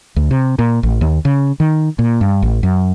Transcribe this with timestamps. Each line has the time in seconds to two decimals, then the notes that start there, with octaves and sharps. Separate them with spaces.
0.16 D2
0.31 C3
0.59 A#2
0.83 A1
1.01 D#2
1.25 C#3
1.60 D#3
1.99 A#2
2.21 G2
2.42 A1
2.63 F#2